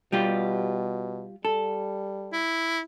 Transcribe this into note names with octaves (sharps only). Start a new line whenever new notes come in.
B2 G3 F4 G4
G3 A4
E4